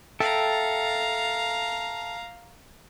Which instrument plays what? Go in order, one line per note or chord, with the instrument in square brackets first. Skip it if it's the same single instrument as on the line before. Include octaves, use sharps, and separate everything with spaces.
[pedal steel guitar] A4 E5 G5 [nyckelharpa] F5 A#5